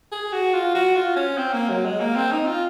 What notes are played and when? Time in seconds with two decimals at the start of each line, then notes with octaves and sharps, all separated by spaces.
0.12 G#4
0.32 F#4
0.53 F4
0.75 F#4
0.95 F4
1.16 C#4
1.37 C4
1.53 A#3
1.69 F#3
1.85 G#3
2.00 A#3
2.15 C4
2.32 D#4
2.46 F4